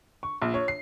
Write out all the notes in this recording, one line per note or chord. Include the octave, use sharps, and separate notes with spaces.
C#6
A#1
C#5
C7